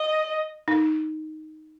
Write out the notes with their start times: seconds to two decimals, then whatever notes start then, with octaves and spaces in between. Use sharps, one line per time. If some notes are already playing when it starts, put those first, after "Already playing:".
Already playing: D#5
0.68 D#4